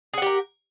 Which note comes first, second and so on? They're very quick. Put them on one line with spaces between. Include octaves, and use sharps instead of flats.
G#4 F#5 G4 A#4